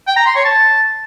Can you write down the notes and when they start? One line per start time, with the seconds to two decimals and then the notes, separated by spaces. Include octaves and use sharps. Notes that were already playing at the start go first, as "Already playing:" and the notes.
0.07 G5
0.16 A#5
0.26 C6
0.35 C#5
0.45 A5